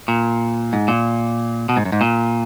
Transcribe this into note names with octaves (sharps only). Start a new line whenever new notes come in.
A#2
G#2
A#2
B2
G#2
F#2
G#2
A#2